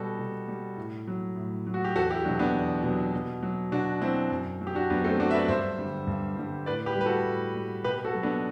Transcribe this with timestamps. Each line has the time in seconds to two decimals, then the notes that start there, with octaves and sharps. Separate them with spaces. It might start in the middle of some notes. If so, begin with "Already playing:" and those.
Already playing: B2 G3 F#4 A4
0.19 B2
0.48 G3
0.77 A2
1.07 F#3
1.36 A2
1.67 F#3
1.74 F#4
1.85 G4
1.95 E2 F#4 A4
2.10 E4 G4
2.25 B2 F#3 D4 F#4
2.39 B3 D4
2.54 E2
2.83 B2 F#3
3.13 B2
3.43 F#3
3.72 B2 D4 F#4
4.01 F#3 C4 E4
4.30 F#2
4.61 F#3
4.67 G4
4.75 D4 F#4
4.90 F#2 B3 D4
5.05 A3 C4
5.19 F#3 D4 F#4
5.31 E5
5.34 B4 D5
5.48 G2 C5 E5
5.79 D3 G3
6.07 G2
6.37 D3 G3
6.66 A2 B4 D5
6.86 G4 B4
6.96 G3
7.01 B4
7.06 F#4 A4
7.25 A2
7.54 G3
7.84 B2 G4 B4
8.05 F#4 A4
8.15 F#3
8.23 B3 D4